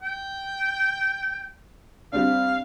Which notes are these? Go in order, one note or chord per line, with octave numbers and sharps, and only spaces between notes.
G5
G3 C4 D4 F5